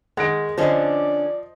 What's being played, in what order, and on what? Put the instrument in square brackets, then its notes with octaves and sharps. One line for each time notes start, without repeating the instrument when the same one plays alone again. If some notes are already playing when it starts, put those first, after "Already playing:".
[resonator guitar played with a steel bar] D#3 [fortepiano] G#3 [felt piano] F#5 A#6 D7
[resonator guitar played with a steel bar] D3 C#4 D4 [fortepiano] F3 [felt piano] C5 D#5 [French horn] D5